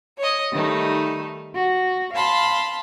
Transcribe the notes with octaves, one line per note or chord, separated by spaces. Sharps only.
C#5 D#5
D#3 G3 A3 D#4
F#4
F5 A5 B5 C6